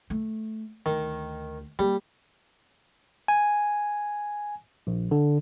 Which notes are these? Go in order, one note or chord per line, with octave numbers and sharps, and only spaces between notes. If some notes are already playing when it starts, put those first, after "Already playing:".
A3
D2 D#3
G3 A#3
G#5
A#1
D3